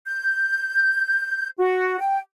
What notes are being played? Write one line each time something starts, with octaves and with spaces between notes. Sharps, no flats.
G6
F#4
G5